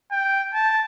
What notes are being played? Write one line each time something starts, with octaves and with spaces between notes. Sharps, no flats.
G5
A5